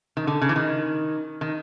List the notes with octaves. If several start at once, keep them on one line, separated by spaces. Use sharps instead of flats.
D#3
D3
C#3
E3
D#3
D#3